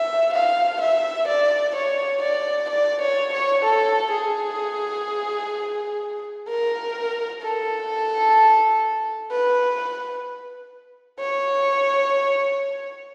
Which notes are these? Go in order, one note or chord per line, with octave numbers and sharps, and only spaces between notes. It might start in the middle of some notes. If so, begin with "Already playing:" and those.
Already playing: E5
F5
E5
D5
C#5
D5
D5
C#5
C#5
A4
G#4
A#4
A4
B4
C#5